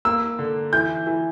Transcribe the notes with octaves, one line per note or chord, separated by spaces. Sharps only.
A#3 E6
D3
E3 G6
E3